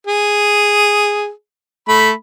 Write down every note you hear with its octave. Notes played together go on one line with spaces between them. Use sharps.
G#4
A3 B5